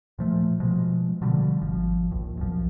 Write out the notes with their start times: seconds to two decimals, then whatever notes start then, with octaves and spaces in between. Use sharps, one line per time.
0.19 A#2 F3 A3
0.60 B2 F3 G#3
1.22 B2 D3 F3 G3
1.62 G#1 F3
2.11 A#1 D#2
2.37 B1 F#2 F3